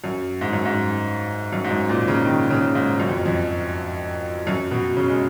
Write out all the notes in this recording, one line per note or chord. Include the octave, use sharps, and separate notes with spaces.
F#2
G#2
F#2
G#2
F#2
G#2
F#2
A#2
C#3
D#3
C#3
G#2
F#2
F2
F2
F#2
B2
C#3
G#3